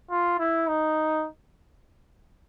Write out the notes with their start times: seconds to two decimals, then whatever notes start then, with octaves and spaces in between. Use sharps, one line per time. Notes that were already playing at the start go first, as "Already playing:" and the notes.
0.11 F4
0.39 E4
0.68 D#4